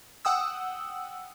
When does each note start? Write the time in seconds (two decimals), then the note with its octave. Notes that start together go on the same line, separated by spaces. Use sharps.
0.25 F#5 G5 D#6 E6